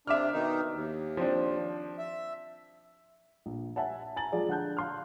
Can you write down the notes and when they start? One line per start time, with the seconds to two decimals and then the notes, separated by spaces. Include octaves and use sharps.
0.07 C3 D4 E5 D6 F6
0.32 B2 D#3 D#4
0.72 D#2
1.17 F3 C4 D4
1.98 E5
3.46 A#1
3.76 E5 F#5 G#5 A5
4.16 G#5 A#5 A6 F#7
4.32 F3 G#3 F4 G#4 D5
4.48 D3 F#5 A5 F#6 G6
4.77 F5 C6 F6